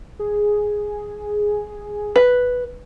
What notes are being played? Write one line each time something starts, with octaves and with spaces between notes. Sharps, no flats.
G#4
B4